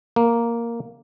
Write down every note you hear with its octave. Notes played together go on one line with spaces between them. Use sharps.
A#3